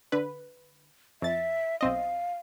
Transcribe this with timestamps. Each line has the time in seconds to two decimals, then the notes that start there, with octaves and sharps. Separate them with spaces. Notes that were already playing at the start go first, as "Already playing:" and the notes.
0.12 D3 B4
1.22 F2 E5 A6
1.81 B1 C4 D#5 F5